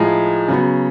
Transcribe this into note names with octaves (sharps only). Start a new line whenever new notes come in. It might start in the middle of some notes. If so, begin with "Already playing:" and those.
Already playing: A2 F3 G#3 A#5
C#3 F#3 B3